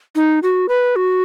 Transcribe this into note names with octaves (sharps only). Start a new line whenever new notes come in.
D#4
F#4
B4
F#4